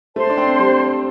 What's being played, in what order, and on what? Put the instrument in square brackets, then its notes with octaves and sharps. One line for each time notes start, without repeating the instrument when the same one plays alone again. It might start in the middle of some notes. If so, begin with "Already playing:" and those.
[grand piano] A3 [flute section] C5 A5 C6
[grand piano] D4
C4
G3